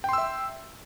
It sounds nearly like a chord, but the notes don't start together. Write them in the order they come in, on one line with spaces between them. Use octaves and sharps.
G5 C6 E6 E5